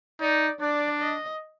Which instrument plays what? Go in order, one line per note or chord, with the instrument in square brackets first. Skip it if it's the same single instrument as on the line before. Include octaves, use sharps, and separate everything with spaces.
[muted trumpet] D#4 [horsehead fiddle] D5
[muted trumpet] D4 [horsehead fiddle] D5
[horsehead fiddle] D#5